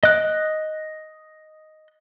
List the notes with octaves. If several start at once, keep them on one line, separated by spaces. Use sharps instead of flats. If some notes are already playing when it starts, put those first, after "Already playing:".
D#5 F#6